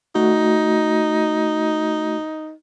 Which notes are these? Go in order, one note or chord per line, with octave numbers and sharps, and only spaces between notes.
A3 D#4 F#4